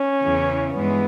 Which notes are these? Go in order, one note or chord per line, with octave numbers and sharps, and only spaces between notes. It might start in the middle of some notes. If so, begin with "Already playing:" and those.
Already playing: C#4
E2 C#3 E3
G2 E3 G#3 B3